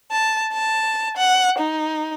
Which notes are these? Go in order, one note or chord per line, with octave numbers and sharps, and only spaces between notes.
A5
A5
F#5
D#4